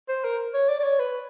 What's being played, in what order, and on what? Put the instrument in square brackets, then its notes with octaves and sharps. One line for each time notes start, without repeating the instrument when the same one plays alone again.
[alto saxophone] C5
A#4
C#5
D5
D5
C#5
B4